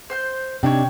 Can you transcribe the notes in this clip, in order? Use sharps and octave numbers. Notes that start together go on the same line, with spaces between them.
C5 C6 G6
C3 D4 D#4 C#5 G5